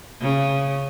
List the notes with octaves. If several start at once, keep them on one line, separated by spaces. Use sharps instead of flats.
C#3